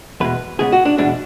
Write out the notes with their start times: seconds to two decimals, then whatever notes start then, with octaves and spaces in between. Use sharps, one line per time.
0.20 E2 B2 G#3 B4
0.59 C#2 C#3 G#3 B3 G#4
0.72 F#4
0.85 D4
0.98 E2 B2 G#3 D4